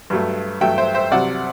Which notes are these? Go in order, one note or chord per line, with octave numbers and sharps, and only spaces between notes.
G2 F#3 A3
G2 F#3 A3 E5 G5
C5 E5
C5 E5
C2 C3 F#3 D5 F#5